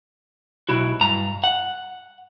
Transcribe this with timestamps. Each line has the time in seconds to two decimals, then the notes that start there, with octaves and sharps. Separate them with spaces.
0.69 B1 E4 F#4
1.01 G2 A#5
1.44 F#5